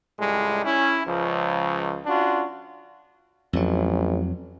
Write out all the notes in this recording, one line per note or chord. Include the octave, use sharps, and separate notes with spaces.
C#2 A2 G3 G#3
C#4 E4
C#2 F3
C#4 D4 F4 F#4
A1 F2 F#3